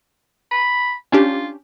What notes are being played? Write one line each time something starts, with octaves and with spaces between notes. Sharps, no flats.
B5
C#4 D4 F4 G4